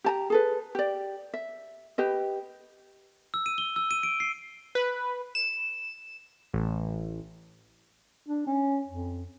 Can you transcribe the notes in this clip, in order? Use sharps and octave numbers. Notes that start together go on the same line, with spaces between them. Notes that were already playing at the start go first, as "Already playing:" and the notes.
G4 A5 A#5
G#4 A4 B4
G4 D5
E5
G4 B4 D#5
E6
D#7
G7
E6
D#7
D7
C7
B4
E7
A1
D4
C#4
F2